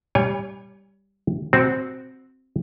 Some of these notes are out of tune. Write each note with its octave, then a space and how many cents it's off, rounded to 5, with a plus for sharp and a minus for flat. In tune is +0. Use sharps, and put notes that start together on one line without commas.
G3 +0 C#5 +20 G#5 -35
C4 +0 F#4 +0